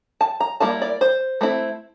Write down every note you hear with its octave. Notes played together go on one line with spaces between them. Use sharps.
A5
A#5
G3 A#3 E4 A5
D5
C5
A3 C4 E4